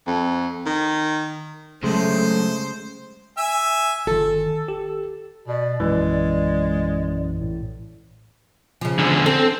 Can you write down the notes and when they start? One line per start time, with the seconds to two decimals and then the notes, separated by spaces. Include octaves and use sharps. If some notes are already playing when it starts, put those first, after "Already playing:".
0.07 F2
0.66 D#3
1.83 F#2 A2 C#3 G#3 A3 C5
3.38 E5 G#5 E6
4.07 G1 D#3 A4
4.68 G4
5.48 B2 D5
5.80 A#1 F#2 E3 G#3
7.41 A2
8.81 C#3 F3
8.98 E2 D3
9.26 C4 A4